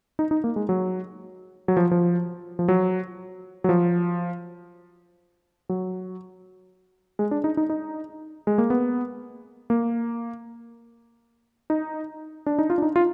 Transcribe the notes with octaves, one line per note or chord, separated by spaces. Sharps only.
D#4
D#4
A#3
G#3
F#3
F#3
F3
F3
F3
F#3
F#3
F3
F#3
G#3
D4
D#4
D#4
D#4
G#3
A#3
B3
A#3
D#4
D4
D#4
F4
D4
D#4
F4